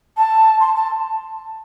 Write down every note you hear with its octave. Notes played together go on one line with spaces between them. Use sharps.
A5
C6
A5